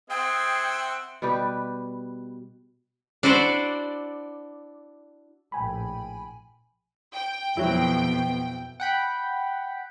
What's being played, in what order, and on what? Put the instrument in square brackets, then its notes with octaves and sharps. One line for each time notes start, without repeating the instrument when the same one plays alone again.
[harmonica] C4 E5 F#5 [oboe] G#4 [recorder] G5
[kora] B2 G3 G4 B4
[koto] D4 E4 F#4 C5 D5
[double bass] A#1 A2 [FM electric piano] G5 G#5 B5
[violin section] G5
[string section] F2 B2 [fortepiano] F#3 E4
[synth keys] F#5 G5 B5